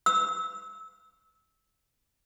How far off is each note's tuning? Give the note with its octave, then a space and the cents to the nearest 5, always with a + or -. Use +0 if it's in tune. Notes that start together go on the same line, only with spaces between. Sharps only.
E6 -25